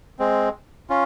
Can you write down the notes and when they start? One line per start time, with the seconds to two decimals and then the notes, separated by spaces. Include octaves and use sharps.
0.19 G#3 C4
0.89 C#4 F4